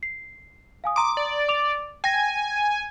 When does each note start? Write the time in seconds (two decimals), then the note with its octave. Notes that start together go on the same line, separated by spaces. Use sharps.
0.03 C7
0.84 F5 G#5 D#6
0.96 A#5 C6 D6 D#6
1.17 D5
1.49 D6 F7
2.04 G5 G#5 A#6